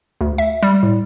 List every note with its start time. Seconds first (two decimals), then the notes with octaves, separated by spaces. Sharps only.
0.21 D2
0.38 E5
0.62 G3
0.83 A2